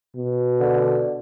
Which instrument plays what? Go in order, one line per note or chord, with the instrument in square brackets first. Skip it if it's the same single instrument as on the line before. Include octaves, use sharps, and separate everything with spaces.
[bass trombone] B2
[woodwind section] D3